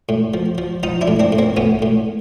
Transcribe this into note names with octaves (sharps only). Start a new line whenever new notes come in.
A2
F3
F3
F3 D#4 F4
D4 E4
A2
C4 D4
A2
A#3 C4
A2 B3 C#4
A2